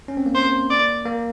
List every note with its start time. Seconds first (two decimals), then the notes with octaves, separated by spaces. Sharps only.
0.08 C#4
0.17 C4
0.26 A#3
0.35 C5
0.70 D5
1.06 A#3